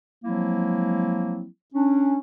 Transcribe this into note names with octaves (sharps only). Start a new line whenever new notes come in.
F3 F#3 G#3 A#3 C4 E4
C#4 D4